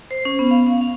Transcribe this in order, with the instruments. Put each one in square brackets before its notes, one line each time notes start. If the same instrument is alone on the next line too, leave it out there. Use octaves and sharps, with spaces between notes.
[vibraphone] C5
C#4
B3
F5
C#4
F5